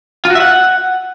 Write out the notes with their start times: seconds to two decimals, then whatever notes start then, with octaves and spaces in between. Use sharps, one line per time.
0.25 F4
0.30 F#4
0.35 E5
0.40 F#5